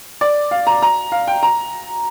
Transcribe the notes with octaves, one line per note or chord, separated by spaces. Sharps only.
D5
F5
A#5
A#5
F5
G5
A#5